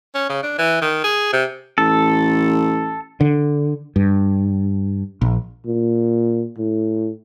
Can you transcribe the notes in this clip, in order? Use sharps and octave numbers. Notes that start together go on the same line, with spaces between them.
C#4
C#3
D4
E3
D#3
G#4
C3
A1 A4
D3
G2
A#1
A#2
A2